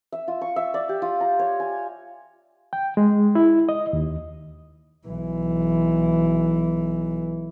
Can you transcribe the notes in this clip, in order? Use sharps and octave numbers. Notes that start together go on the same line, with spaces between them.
E5
F4
C#6
E5
D5
G4
F4
A#5
C#5
G#5
G5
G#3
E4
D#5
D#2
B1 E3